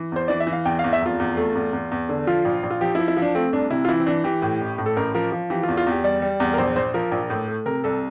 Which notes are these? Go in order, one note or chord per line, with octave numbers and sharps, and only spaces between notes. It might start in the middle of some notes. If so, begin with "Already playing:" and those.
Already playing: E3
E2 C5
E3 D5
E5
E3
F5
E2 G5
F5
E2
E5
F1 F4
E2
A3
E2
E2
E2
D3
F3 F4
A#1
A#1
F4
F3 G4
F3 E4
E4
F3 D4
A3 C4
C2 D4
C3 E4
F4
E3 E4
C4
E3 D4
E3 G4
A2
A1
A2
A4
A1 A#4
F3 A#4
F3
E3 G4
F4
E2
F4
E2 G4
G3 D5
G3
E2
A#4
A#1 C5
A#1 C5
F3 A#4
A#1
A2
A3
C3 A#4
C2 A4